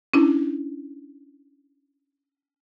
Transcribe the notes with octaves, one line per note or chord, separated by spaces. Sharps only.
C#4 D4 E4